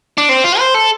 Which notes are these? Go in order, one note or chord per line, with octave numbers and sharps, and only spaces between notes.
D4
C4
F4
C5
A4